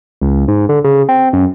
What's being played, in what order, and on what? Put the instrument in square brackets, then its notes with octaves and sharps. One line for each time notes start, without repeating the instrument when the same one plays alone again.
[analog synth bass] C#2
G#2
D3
C#3
C4
F#2